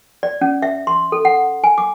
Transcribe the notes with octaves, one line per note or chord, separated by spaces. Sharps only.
D5
C#4
E5
C6
A4
F#5
G#5
D6